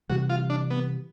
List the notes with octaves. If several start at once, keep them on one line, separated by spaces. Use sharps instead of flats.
C3 E3 G3 F#4
F4
D4
B3